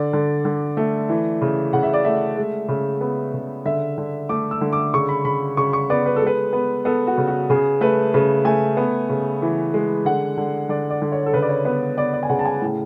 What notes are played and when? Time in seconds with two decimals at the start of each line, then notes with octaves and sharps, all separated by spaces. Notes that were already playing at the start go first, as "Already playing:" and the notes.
Already playing: D3 D5
0.13 D3
0.45 D3
0.77 A3
1.09 E3
1.42 C#3
1.73 C#3 F#5
1.83 E5
1.94 D5
2.05 A3 E5
2.37 G#3
2.69 C#3
3.01 B3
3.34 C#3
3.65 D3 E5
3.98 D3
4.29 A3 D6
4.51 E6
4.61 D3
4.73 D6
4.93 C#3 C#6
5.09 B5
5.25 C#3 B5
5.57 C#3 C#6
5.73 C#6
5.90 B3 D5
6.06 B4
6.16 A4
6.22 G#3 B4
6.53 B3
6.85 B3 A4
7.07 F#4
7.18 C#3
7.27 F#4
7.50 C#3 G#4
7.81 A3 B4
8.14 C#3 B4
8.45 A3 G#5
8.77 B3
9.09 C#3
9.42 E3
9.74 G#3
10.05 D3 F#5
10.38 D3
10.69 D3 D5
10.90 D5
11.02 D3
11.12 C#5
11.26 A4
11.33 C#3 B4
11.42 D5
11.49 C#5
11.65 B3 B4
11.97 B3 D5
12.14 D5
12.23 G#5
12.29 C#3 F#5
12.39 A5
12.46 G#5
12.61 A2